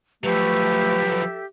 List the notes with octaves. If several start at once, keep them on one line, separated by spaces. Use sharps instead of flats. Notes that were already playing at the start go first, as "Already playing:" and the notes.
F3 F#3 A3 G4 B4
A4 E5